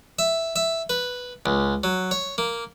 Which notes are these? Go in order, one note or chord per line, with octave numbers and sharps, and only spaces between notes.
E5
E5
B4
C#2
F#3
C#5
A#3